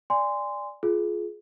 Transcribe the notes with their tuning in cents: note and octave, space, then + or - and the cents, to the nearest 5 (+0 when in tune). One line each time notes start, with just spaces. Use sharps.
D5 +0 G#5 -25 C6 -15
F4 +0 G#4 +25